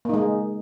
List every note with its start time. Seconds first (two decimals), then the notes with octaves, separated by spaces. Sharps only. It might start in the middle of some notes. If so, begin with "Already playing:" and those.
0.05 A#3
0.09 D#4
0.14 G#3